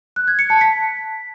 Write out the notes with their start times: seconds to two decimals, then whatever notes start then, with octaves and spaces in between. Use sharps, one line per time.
0.16 F#6
0.28 G#6
0.39 C#7
0.50 A5
0.61 B6